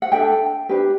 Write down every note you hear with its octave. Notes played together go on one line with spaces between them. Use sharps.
F#5
D4 A4 E5 G5
D4 G4 B4